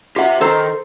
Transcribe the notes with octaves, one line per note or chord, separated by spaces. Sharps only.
F4 G4 E5 F#5
D#3 A4 C5 A#5